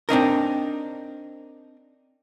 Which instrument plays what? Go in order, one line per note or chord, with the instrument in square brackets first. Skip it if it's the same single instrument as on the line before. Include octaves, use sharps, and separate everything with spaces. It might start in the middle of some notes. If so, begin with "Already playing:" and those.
[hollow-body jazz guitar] C4 D4 D#4 A#4